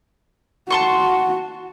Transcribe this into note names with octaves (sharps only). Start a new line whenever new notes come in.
F#4 A5 C6 C#6